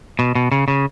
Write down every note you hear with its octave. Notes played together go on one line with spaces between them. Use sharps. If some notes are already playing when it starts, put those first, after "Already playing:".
B2
B2
C#3
C#3